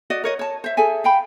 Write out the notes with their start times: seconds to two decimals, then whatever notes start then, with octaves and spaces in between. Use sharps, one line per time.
0.10 F#4 D5 D#5
0.24 A#4 C#5 D#5
0.39 C#5 A5
0.64 C5 E5
0.77 G#4 A4 E5 G#5
1.04 F5 G5 B5